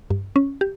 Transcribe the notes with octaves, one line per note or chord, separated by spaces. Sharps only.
G2
C#4
G4